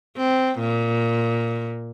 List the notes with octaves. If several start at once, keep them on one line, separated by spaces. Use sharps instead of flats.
C4
A#2